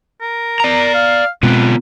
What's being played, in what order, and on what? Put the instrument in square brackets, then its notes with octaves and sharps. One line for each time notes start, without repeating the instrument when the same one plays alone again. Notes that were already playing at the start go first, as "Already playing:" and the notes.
[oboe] A#4
[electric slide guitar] D5 A#5
[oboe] F5
[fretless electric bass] B2 G#3 C4 [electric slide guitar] B3 F4 G5 [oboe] B4